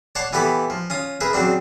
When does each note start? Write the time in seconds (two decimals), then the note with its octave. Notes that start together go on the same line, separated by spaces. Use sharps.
0.15 C#5 D5 F#5 A5 C6 C#6
0.33 E3 B3 G4 A4 B5
0.70 F3
0.90 C#4 F4 D#6
1.21 G#4 A#4 B4 E5
1.33 C#3 F#3 C4 D4